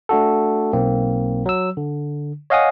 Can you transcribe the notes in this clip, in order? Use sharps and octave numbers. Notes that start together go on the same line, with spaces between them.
A3 D4 F#4 A4
B1 A#3 C4
F#3 E6
D3
C#5 D#5 F5 F#5 G#5 D#6